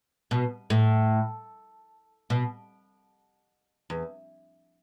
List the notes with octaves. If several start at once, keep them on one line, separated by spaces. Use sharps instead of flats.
B2
A2
B2
E2